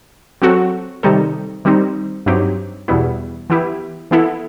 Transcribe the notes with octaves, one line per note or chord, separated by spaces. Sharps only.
F#3 C4 F#4 A4
C3 D#3 G3 D#4 A4
D#3 G3 C4 D#4
G2 F#3 C4 D#4 G4
E2 B2 G3 B3 E4
E3 B3 E4 G4
E3 B3 E4 A4